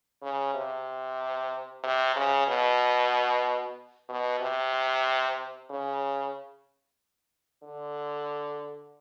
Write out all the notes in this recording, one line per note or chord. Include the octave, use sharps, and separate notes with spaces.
C#3
C3
C3
C#3
B2
B2
C3
C#3
D3